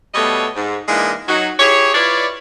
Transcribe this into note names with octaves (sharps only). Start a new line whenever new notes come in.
B2 G3 A3 C#5 D#5
G#2
E3 G#3 A#3 D4 D#4 F4
F#3 D#4 F#4
E4 G4 G#4 C#5
E4 F4 B4 C#5 D5